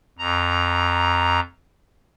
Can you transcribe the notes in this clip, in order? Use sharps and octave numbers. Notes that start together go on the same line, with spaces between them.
F2 A#5